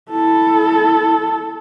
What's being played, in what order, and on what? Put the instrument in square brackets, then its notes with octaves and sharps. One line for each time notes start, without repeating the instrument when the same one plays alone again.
[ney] E4 [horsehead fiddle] A4